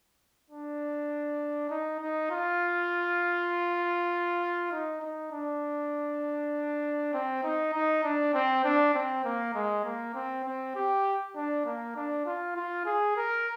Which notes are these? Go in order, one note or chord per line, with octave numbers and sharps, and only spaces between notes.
D4
D#4
D#4
F4
D#4
D#4
D4
C4
D#4
D#4
D4
C4
D4
C4
A#3
G#3
A#3
C4
C4
G4
D4
A#3
D4
F4
F4
G#4
A#4